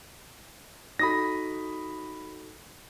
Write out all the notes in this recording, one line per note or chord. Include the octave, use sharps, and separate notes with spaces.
D#4 F#4 A4 B5 D#6 A#6